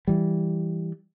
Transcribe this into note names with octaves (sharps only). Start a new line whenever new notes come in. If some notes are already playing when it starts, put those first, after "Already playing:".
E3 G3